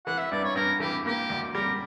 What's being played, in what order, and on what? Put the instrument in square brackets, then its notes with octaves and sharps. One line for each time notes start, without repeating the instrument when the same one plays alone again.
[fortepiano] E3 [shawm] F#5
[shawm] E5
[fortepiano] G2 [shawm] D5
[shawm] C#5
[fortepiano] G2 [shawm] A#4
[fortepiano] E3 [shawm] G4
[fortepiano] A#3 [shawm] G4
[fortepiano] D2
[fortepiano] G3 [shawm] A#4